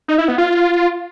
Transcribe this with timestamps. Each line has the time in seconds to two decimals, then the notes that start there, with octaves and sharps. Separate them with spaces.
0.08 D#4
0.18 E4
0.28 B3
0.38 F4